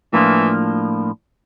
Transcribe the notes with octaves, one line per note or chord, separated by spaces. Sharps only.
A2 E3 F3 A#3 D4 F4